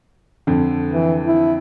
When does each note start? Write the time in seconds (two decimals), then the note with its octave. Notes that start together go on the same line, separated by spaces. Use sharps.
0.47 F2 D3
0.92 E3
1.26 E4